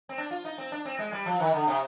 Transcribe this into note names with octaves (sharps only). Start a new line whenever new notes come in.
C4
D4
F4
D#4
C4
D4
C4
G#3
G3
F3
D#3
D3
C3